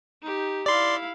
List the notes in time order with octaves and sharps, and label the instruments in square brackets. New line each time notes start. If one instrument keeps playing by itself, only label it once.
[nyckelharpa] D#4 G4
[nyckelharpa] E4 F5 [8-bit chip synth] D5 C6